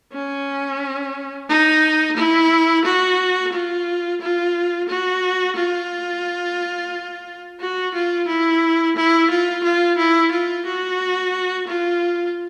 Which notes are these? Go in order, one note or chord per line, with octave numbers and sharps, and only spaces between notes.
C#4
D#4
E4
F#4
F4
F4
F#4
F4
F#4
F4
E4
E4
F4
F4
E4
F4
F#4
F4